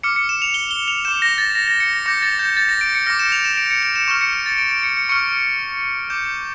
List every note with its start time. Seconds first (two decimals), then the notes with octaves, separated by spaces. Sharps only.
0.03 D6 F6 C#7
0.16 C#7
0.29 E7
0.42 F7
0.54 G7
0.71 G7
0.88 F7
1.05 D6 G6 E7
1.22 A#6
1.38 A6
1.55 A#6
1.68 A#6
1.80 C#7
1.93 A#6
2.06 D6 G6 A#6
2.22 A6
2.39 G6
2.57 A6
2.69 A#6
2.81 D7
2.94 C#7
3.06 D6 F6 A#6
3.19 E7
3.32 F7
3.44 E7
3.57 D7
3.70 C#7
3.82 D7
3.96 E7
4.08 C#6 E7
4.11 F6
4.21 C#7
4.33 D7
4.46 A6
4.58 D7
4.71 D7
4.83 C#7
4.97 C#7
5.09 C#6 F6 C#7
6.10 D6 G6